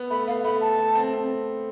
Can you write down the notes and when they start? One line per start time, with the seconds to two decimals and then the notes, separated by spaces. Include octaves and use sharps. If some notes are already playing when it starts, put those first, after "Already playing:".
Already playing: B3
0.10 A3 B5
0.28 B3 F5
0.44 A3 B5
0.61 A5
0.78 A3
0.95 C4
1.13 C4